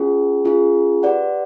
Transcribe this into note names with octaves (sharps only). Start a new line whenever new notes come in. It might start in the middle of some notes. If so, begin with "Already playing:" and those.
Already playing: C#4 F4 G#4
C#4 F4 G#4
G4 B4 D5 F#5